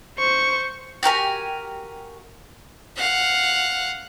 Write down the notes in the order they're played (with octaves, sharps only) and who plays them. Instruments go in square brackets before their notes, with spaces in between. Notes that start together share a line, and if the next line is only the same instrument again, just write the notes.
[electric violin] C5 C#6
[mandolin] F#4 G4 A#4 G#5
[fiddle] F5 F#5